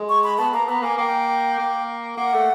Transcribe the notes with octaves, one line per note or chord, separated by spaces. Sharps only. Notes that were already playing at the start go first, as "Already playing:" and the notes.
Already playing: G#3
C#6
B5
B3 A5
A#3 A#5
B3 A#5
A#3 G#5
A#3 G5
A#3
A#3 F#5
A3